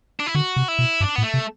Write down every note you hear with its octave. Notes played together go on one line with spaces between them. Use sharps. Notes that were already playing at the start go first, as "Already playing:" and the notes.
D4
E4
D3 F#4
C3
E4
B2
G2 D4
A2 B3
A3
C3